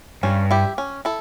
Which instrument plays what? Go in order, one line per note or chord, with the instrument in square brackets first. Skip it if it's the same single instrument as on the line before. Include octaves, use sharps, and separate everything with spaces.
[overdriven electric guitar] G2 [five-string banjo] C#4
[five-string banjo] E4 G4
C#4
E4 A4